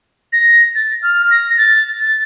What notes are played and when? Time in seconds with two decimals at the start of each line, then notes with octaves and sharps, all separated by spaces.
0.33 A#6
0.75 A6
1.03 F6
1.31 A#6
1.58 A6
2.00 A6